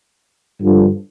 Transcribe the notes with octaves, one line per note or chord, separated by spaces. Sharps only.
G2 D3 F3